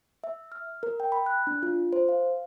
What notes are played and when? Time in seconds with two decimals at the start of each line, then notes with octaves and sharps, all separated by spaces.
0.24 E5
0.52 F6
0.83 A#4
1.00 G5
1.12 B5
1.26 F#6
1.47 D4
1.63 F4
1.93 C5
2.09 F5